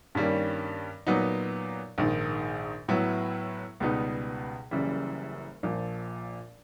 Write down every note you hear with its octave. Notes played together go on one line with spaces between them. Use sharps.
G2 D#3 G3 A#3 C#4
A#2 F#3 B3 D#4
A#1 G#2 D#3
A2 F#3 B3 E4
C#2 B2 G3 B3 D#4
F#1 F#2 C#3 E3 G3
A#1 A#2 F3